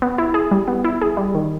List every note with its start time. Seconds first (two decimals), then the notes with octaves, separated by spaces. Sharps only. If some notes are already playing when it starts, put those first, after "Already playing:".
0.02 B3
0.18 E4
0.34 G#4
0.51 G3
0.68 B3
0.84 E4
1.02 G#4
1.17 G3
1.35 D#3